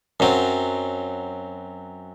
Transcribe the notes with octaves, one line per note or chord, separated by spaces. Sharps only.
F#2 F#3 C4